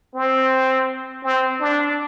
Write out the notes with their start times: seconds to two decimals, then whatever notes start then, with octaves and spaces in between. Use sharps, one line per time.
0.15 C4
1.24 C4
1.61 D4